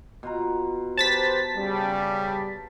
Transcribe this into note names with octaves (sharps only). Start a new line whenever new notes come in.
B2 F4 A#5
G4 B4 C5 A5 A6 B6
C#3 G3